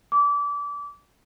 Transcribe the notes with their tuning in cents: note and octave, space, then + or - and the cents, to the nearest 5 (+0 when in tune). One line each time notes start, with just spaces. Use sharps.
D6 -25